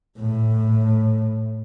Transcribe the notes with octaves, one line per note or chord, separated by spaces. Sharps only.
A2